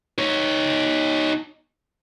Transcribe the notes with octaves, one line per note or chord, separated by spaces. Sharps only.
D#4 C#5